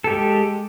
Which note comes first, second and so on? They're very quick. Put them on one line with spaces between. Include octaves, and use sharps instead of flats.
A4 G4 G#3